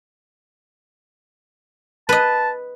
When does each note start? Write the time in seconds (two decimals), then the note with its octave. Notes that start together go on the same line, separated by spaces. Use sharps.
2.09 B4 D#5 A5